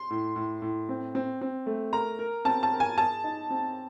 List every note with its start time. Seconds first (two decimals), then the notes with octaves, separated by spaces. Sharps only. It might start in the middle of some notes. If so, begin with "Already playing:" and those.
Already playing: C6
0.10 A2
0.36 A2
0.62 A2
0.89 C4
1.15 C4
1.41 C4
1.66 A3
1.93 A#4 A#5
2.19 A#4
2.45 C4 A5
2.63 A5
2.72 A#4
2.80 G#5
2.98 G#4 A5
3.24 D#4
3.50 C4